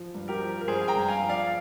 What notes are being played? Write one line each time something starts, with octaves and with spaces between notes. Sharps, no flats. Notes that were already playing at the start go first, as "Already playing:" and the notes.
Already playing: F3
G2
G4 A#4
F3
A#4
G2 G#4 C5
G#5
G5 A#5
G2
F5 G#5
F3
D5 F5